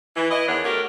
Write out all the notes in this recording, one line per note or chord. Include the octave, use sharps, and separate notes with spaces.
E3
E4 D#5
E2 D#3 D4 C#5 F#5
A3 F#4 G4 A#4